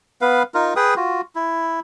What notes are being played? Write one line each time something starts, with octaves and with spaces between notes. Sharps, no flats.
B3 B4 F5
D#4 F4 A#4
G#4 B4 G5 D#6
F4 F#4
E4